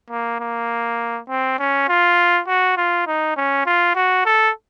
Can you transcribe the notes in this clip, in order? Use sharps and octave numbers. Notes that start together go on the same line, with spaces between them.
A#3
A#3
C4
C#4
F4
F#4
F4
D#4
C#4
F4
F#4
A4